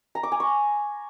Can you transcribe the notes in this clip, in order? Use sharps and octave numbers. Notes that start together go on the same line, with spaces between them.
A#5
D6
G#5
C#6